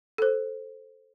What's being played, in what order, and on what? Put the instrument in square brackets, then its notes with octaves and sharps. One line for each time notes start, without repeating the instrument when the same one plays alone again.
[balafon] A4 C5